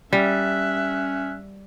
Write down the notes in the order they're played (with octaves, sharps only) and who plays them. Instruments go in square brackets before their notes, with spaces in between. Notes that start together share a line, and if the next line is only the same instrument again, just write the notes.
[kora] G3 [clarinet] C#4 [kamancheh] E5 F#6